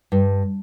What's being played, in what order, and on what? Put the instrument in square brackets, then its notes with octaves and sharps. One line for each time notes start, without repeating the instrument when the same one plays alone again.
[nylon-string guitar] G2